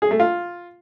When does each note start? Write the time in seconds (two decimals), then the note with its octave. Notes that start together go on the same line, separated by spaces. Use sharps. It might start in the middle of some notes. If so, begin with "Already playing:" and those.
0.02 G#4
0.11 A3
0.20 F4